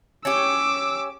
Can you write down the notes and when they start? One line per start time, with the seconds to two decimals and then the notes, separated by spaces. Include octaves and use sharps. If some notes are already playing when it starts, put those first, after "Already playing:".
0.25 C#4 G4 D6 E6